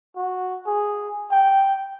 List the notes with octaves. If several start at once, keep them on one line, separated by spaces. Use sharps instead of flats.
F#4
G#4
G5